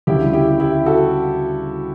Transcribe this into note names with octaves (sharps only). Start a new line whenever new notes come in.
D2 C#3 G3 E4 G4
E4 G4
E4 G4
F#4 A4